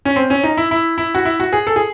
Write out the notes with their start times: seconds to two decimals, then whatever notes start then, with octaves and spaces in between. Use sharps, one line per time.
0.05 C#4
0.16 C4
0.30 C#4
0.44 D#4
0.57 E4
0.71 E4
0.98 E4
1.15 F#4
1.25 E4
1.40 F#4
1.53 G#4
1.67 A4
1.76 G#4